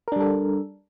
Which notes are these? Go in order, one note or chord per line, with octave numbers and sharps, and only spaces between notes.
G3 D4 A4 A#4